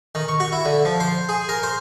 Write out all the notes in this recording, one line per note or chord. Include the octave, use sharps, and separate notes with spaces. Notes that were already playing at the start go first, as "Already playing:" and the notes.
D#3
C#6
F#4
E4
D3
F3
C5
G#4
A#4
C5